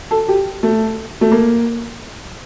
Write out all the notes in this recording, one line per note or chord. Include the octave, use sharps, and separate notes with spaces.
A4
G4
A3
A3
A#3